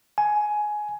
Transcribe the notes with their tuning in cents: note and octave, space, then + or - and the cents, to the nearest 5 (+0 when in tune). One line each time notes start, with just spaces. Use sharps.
G#5 +15